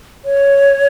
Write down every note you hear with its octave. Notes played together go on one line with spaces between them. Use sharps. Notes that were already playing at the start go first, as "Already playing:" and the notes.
C#5